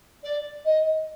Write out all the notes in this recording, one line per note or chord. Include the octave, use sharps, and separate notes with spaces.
D5
D#5